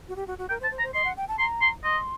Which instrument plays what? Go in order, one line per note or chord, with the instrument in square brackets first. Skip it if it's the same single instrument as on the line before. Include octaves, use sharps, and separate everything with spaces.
[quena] F#4
G4
F#4
F#4
[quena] A#4 [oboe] G5
[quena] C5
[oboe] A5
[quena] C5
[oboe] A#5
[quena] C5
[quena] D#5 [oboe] C6
[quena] F#5
G5
A5
[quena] A#5 [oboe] C6
[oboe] C6
[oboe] D#5 [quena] C6